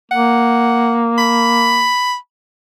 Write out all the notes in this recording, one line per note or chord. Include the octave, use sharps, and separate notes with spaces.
A#3 F#5
B5